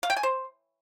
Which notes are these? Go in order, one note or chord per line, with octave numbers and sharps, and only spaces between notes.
F5
G5
G#5
C5